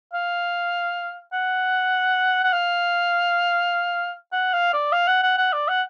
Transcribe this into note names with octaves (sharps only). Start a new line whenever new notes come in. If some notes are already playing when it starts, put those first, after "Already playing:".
F5
F#5
F#5
F5
F#5
F5
D5
F5
F#5
F#5
F#5
D5
F#5